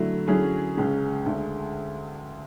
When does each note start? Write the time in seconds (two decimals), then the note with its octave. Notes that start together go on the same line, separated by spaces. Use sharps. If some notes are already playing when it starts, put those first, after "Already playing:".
Already playing: D3 F#3 A3 E4
0.27 D3 F#3 C#4 E4 G#4
0.77 C#2 C#3 G#3 C#4
1.26 D2 D3 G#3